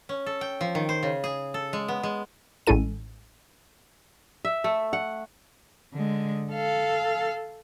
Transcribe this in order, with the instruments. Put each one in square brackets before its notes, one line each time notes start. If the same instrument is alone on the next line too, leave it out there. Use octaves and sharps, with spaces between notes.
[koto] C#4
A4
G5
F3
D#3
C5
C#3
G#4
A4
G#3
B3
G#3
[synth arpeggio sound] A1 G#3 C#4 E4 A4 D#7
[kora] E5
A3
F#5
[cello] D3 G#3
A4 F5